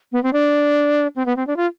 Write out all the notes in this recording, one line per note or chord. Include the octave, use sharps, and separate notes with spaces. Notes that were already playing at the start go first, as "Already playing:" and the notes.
B3
C4
D4
C4
B3
C4
D4
F4